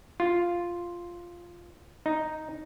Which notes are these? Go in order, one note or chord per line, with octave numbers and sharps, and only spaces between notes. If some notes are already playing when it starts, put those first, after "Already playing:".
F4
D#4